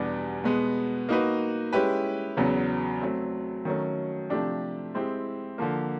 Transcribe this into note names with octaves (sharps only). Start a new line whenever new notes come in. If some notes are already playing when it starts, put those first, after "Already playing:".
Already playing: E2 B2 G3 B3 D4
B2 G#3 B3
A#3 D#4 F#4 B4
G#3 C#4 E4 G4 B4
E2 C#3 F#3 B3
F#3 A3 C4
D#3 F#3 A3 C#4
C3 F3 A3 D4 G4
G#3 C4 E4 G4
D3 F3 A#3